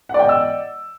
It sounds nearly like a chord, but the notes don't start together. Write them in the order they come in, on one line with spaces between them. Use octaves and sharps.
F#5 D5 G5 D#5 E6